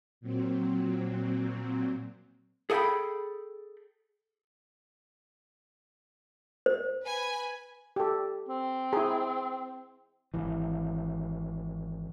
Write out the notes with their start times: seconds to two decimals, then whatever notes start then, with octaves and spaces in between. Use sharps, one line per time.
0.21 A#2 F#3 C4
2.70 G#4 A4 D#5 F5 G5 B5
6.66 C5
7.04 B4 G#5 B5
7.96 G4 A4
8.49 C4
8.93 E4 G#4
10.34 G#1 E3